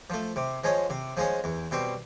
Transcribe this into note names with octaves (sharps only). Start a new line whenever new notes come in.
F3 A3
C3
F3 G#3 C#4
C3
F3 G#3 C#4
E2
B2 G3 C4